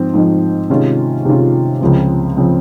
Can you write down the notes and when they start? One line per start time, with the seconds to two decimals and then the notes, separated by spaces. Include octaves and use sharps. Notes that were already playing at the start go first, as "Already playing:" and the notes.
Already playing: G#2 F3 C4
0.14 G#2 F3 C4 D#4
0.70 C3 D#3 G#3 C#4 F4
1.25 C3 D#3 G#3 C#4 F4
1.81 C#2 C#3 F3 C4
2.37 C#3 F3 C4